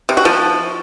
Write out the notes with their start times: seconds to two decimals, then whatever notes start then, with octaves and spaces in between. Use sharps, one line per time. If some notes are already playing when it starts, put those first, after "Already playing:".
0.09 C3
0.17 F#4
0.25 F3